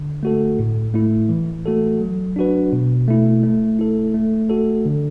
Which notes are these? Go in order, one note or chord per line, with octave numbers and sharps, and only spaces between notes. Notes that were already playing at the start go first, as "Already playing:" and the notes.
Already playing: D3
A3 F#4 A4
A2
A3 E4
E3
A3 F#4 A4
F#3
D4 F#4 B4
B2
A3 E4
A3
E4 A4
A3
F#4 A4
D3